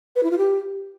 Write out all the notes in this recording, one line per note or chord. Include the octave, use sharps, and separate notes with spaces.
B4
E4
F4
G4